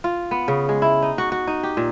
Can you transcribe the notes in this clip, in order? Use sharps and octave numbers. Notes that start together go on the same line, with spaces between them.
F4
B3
C#3
G#3
E4
D#4
F#4
F#4
D#4
G4
A#2